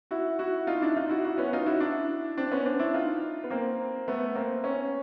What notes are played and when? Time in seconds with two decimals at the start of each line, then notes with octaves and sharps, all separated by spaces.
0.11 E4 F#4
0.39 E4 F#4
0.67 D#4 F4
0.81 D4 E4
0.96 D#4 F4
1.09 E4 F#4
1.24 E4 F#4
1.38 B3 C#4
1.53 D#4 F4
1.66 E4 F#4
1.80 D4 E4
2.38 C4 D4
2.52 B3 C#4
2.66 C4 D4
2.79 D4 E4
2.94 D#4 F4
3.44 B3
3.51 A#3 C4
4.08 A3 B3
4.35 A#3 C4
4.64 B3 C#4